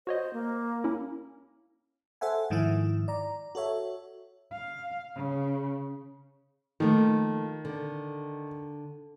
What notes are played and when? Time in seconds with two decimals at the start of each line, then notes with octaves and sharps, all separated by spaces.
0.07 F#4 C5 C#5 D#5
0.33 A#3
0.84 C#4 E4
2.21 A4 C5 E5 F#5 G#5
2.50 G#2 D#3 F3 E4 E5
3.08 D5 A#5
3.55 F#4 A4 C#5 E5
4.52 F5
5.16 C#3
6.80 D#3 F3 A3 A#3
7.65 D3